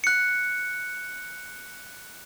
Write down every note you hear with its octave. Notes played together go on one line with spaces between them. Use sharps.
F#6 C#7